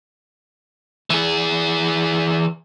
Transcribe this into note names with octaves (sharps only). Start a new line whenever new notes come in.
E3 G#4